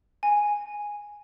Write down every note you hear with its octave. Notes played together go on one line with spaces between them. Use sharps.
G#5